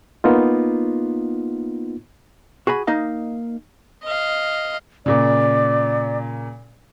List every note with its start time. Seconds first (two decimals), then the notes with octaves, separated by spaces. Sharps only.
0.24 A#3 B3 D#4 F4
2.67 F#4 G#4 G#5 B5
2.87 A#3 D#4 D#5 F5
4.03 D#5 F5
5.06 A#2 C#3 D5